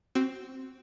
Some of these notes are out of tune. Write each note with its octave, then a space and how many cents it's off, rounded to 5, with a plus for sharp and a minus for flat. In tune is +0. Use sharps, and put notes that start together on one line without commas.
C4 +0 F#4 +20